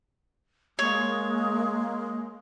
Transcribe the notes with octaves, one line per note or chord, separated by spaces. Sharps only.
G#3 A#3 C#5